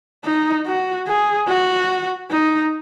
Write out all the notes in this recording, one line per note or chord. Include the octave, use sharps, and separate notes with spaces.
D#4
F#4
G#4
F#4
D#4